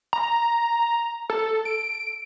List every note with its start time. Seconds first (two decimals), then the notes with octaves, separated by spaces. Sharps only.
0.13 A#5
1.30 A4
1.65 D7